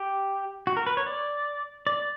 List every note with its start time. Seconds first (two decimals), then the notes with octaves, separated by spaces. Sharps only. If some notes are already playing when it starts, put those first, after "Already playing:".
Already playing: G4
0.67 F#4
0.77 A#4
0.87 B4
0.97 C#5
1.06 D5
1.87 D5